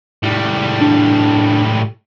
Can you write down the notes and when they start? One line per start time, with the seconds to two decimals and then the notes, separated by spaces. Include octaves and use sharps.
0.23 A2 G3
0.81 D4